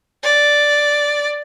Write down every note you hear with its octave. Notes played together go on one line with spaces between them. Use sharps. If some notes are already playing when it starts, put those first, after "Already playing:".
D5